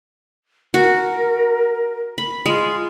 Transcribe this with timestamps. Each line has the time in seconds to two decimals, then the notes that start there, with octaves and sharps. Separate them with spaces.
0.74 F#4 A#4
2.18 B5
2.46 G#3 F4